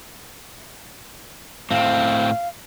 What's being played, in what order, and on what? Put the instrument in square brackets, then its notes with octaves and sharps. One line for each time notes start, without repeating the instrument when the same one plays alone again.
[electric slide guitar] A2 C4 [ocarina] F5